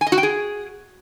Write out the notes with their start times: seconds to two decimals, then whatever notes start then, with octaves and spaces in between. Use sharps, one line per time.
0.01 G#5
0.07 D#5
0.12 F#4
0.18 G5
0.23 G#4